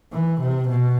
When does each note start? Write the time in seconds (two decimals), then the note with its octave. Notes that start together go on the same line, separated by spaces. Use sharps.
0.12 E3
0.41 C3
0.69 B2